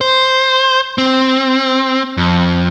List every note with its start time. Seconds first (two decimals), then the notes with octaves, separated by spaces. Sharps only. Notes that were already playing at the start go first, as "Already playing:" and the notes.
0.01 C5
0.98 C4
2.17 F2